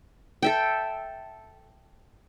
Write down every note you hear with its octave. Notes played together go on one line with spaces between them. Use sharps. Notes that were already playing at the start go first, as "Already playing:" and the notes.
A4 E5 G5